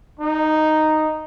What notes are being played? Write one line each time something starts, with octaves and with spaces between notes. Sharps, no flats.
D#4